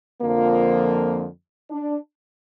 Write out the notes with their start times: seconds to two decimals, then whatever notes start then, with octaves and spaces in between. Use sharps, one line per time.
0.22 F2 D3 F3 A#3
1.70 D4